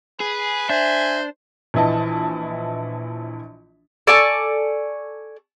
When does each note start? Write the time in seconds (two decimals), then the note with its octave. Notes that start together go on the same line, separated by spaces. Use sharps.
0.20 G#4 B4
0.70 D4 C5 E5 G#5
1.74 A#1 E3 E4 D#5 A5
4.07 A4 D5 G#5 C#6